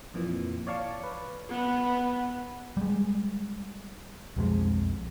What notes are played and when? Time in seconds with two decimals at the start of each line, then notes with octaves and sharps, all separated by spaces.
0.14 F2 A#2 E3
0.67 C#5 D5 F5 A5 C#6
1.03 B4
1.49 B3
2.77 G3 G#3
4.37 B1 F2 G#3